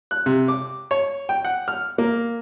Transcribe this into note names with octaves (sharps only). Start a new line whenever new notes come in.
F#6
C3
D6
C#5
G5
F#5
F6
A#3